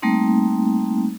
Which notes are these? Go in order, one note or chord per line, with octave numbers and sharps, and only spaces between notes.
G3 A3 A#3 C4 D#4